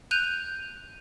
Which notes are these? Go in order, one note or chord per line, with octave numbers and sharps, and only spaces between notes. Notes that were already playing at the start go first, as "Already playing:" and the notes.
F#6 G6 D#7 F7